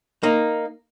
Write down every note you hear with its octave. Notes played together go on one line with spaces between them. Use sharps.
A#3 D#4